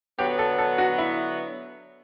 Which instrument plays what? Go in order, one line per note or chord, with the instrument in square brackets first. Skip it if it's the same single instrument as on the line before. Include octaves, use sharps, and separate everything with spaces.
[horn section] D3 F#3 B3 [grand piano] G4
[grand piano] A4
A4
F#4
E4